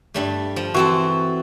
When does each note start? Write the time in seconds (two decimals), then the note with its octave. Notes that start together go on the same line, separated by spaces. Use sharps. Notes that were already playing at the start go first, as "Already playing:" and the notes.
0.14 G2 G3 A3
0.56 F3
0.74 E3 C4 F#4 A4